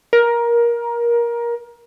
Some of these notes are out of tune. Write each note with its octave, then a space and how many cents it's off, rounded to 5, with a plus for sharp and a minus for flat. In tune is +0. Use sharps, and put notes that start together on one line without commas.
A#4 +20